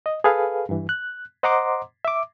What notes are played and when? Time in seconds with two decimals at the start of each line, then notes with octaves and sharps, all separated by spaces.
0.06 D#5
0.24 G#4 A4 B4 F5
0.69 G2 E3
0.89 F#6
1.43 C5 D#5 F#5 A#5 C6 D6
2.05 E5 D6